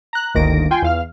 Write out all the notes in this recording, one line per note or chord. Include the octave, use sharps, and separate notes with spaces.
A#5 F#6
G1 D2 D#3 A#3 A#6 D7
F4 G5 G#5 C6
E2 F5 F6